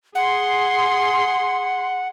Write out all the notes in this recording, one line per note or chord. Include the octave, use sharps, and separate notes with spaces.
G#4 F#5 C6